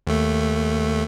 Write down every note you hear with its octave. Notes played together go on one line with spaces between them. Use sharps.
D#2 A3